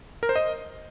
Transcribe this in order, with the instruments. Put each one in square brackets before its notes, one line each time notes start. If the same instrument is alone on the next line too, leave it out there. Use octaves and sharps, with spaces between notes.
[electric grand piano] A#4
C5
D#5